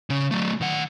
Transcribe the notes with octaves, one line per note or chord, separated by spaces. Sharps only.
C#3 C#4
F#3 A3
D#3 F#5